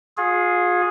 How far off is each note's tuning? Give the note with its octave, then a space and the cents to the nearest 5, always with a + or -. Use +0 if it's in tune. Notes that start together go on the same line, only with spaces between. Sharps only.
F4 +35 G#4 +0